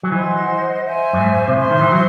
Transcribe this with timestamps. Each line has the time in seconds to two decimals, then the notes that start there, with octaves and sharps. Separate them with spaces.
0.03 F#3
0.12 E3 C5 D#5 F#5 C6
0.84 C5 E5 G#5
1.13 F#2
1.20 G#2
1.48 C3
1.56 A2 C5 E5 C6
1.71 D#3
1.81 E3
1.92 F#3